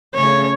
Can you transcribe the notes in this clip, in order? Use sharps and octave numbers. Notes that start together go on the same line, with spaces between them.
C#3 A3 C#4 C#5